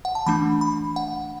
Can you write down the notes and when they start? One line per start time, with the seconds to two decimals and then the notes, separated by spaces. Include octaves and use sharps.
0.05 F#5
0.15 A5
0.26 E3 A3 D4 B5
0.61 B5
0.96 F#5